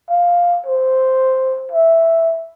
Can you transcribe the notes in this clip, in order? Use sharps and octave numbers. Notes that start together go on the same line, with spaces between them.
F5
C5
E5